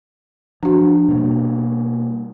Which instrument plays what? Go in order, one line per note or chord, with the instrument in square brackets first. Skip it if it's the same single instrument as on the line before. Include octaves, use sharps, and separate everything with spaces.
[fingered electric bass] F3 [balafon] D4 F#4
[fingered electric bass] B2 G3 A#3